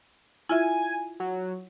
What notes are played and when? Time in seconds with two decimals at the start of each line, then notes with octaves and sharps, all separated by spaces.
0.49 E4 F4 E5 G#5
1.20 F#3